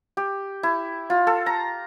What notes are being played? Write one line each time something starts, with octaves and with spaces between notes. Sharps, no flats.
G4
E4
F4
A4
A#5